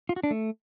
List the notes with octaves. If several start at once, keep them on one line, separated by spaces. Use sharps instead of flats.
F4
F#4
D4
A3